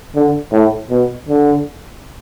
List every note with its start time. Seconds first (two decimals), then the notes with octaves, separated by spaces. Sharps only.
0.15 D3
0.52 A2
0.90 B2
1.28 D3